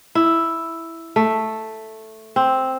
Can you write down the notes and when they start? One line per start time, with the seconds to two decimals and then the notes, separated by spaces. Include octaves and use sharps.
0.15 E4
1.16 A3
2.36 C4